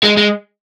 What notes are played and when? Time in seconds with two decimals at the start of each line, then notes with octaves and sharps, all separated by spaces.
0.04 G#3
0.17 G#3